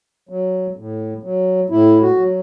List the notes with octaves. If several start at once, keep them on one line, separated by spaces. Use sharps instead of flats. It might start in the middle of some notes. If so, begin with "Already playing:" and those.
F#3
A2
F#3
A2 E4
F#4
F#3